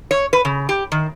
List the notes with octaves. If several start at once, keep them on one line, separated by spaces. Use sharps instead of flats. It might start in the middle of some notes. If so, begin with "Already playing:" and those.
C#5
B4
C#3
G4
D#3